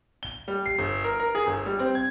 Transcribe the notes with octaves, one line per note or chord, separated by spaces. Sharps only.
G7
G3
C7
G1
A#4
A#4
G#4
G1
G3
C4
G#6